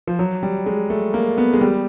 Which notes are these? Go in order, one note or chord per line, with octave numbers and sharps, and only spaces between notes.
F3
F#3
G3
G#3
A3
A#3
B3
G#3
G3